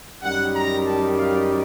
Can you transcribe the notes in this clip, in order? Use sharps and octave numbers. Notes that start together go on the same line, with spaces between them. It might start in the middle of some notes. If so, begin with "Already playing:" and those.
F#2 D#3 G3 F#5
A#5
A5
F5